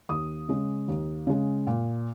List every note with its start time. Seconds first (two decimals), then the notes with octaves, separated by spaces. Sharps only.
0.09 D#2 D#6
0.49 C#3 G#3
0.88 D#2
1.27 C#3 G#3
1.67 A#2